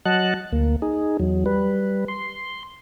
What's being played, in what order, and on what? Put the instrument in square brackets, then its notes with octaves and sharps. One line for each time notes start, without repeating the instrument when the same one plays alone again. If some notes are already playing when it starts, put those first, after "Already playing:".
[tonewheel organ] F#3 D#5 F#5 A5 F#6
D2 A#3
D#4 G#4
E2 F#3
G3 B4
C6